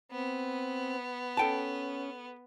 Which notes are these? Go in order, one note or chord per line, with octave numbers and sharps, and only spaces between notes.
B3 C4
C#4 A4 G5 A5